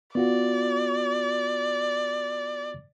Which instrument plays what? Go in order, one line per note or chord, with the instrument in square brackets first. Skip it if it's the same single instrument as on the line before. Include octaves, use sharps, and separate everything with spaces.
[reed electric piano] B3 F4 F#4 [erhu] D5